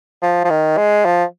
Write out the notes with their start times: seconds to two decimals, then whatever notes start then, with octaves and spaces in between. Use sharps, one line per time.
0.22 F3
0.45 F3
0.50 D#3
0.77 G#3
1.05 F3